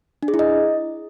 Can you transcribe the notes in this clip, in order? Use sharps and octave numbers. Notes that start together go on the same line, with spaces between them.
D4
G#4
E4
D#5